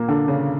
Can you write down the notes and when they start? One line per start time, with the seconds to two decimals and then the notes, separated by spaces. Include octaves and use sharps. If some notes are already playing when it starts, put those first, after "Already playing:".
Already playing: A#2 A#3
0.08 D3 D4
0.28 C#3 C#4